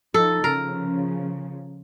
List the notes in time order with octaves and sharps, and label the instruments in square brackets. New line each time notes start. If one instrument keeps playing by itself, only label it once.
[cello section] F3 D#4 [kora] A4
[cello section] C#3 F3 [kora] A#4